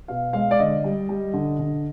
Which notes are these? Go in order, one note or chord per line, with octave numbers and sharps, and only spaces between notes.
B2 F5
G#3 F5
D5
D3 D#5
G3
G3
D3
D3